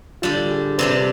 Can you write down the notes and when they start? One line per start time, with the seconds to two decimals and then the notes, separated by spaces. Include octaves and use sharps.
0.22 D3 G3 D4 F4
0.51 G#4
0.78 C3 G3 D4 B4